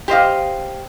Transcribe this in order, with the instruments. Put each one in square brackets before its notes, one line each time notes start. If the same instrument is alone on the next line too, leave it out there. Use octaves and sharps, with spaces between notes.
[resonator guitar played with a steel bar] G4 C5 D#5 F5